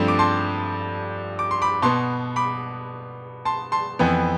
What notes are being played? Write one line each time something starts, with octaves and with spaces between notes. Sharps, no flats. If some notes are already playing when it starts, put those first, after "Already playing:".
Already playing: G2 F3 A3 C4
D6
A5 C6
D6
C6
B5 D6
B2 B3 A5 C6
B5 D6
A5 C6
A5 C6
F2 E3 B3